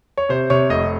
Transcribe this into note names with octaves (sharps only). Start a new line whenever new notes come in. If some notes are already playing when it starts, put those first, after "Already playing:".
C#5
C3 C5
C3 C#5
F1 D#5